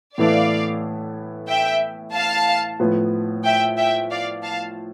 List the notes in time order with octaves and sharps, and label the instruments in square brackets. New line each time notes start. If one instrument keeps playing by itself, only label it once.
[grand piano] A2 E3 B3 E4 A4 [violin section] D5 F5
[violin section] E5 G5
F5 A5
[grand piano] A2 F3 B3
[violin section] E5 G5
E5 G5
D5 F5
F5 A5